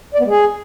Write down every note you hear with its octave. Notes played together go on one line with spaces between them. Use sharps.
D5
B3
G#3
G#4